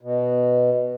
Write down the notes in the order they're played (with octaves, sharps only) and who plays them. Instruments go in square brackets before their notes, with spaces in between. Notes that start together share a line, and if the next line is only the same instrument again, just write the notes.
[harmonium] B2